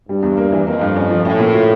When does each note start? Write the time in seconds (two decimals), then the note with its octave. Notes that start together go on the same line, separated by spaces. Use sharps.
0.09 G2 G3
0.23 E2
0.37 A#3
0.52 E3
0.67 F2 A#3
0.81 G2
0.96 C#4
1.11 F3
1.25 A2 C#4
1.39 A#2
1.54 F4